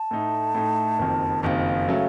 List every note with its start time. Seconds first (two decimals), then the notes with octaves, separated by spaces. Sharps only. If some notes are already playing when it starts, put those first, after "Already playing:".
Already playing: A5
0.11 A2 A3 D#4
0.55 A2 A3 D#4
0.99 F#1 F2 D#3
1.43 F#1 F2 D#3 F5 A5
1.88 C#3 F#3 A3